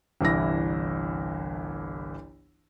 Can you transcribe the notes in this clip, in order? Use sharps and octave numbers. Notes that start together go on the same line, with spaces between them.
G1 C2 E3 E4 A#6